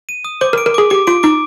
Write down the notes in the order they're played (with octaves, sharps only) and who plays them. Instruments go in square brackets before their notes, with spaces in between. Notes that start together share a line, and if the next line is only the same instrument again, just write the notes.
[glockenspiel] D#7
D#6
[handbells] C5 [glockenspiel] D6
[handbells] A#4
[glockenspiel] D7
[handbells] A#4
[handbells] G#4 [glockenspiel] D6
[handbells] G4 [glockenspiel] D6
[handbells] F4 [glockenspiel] D7
[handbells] D#4 [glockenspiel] D6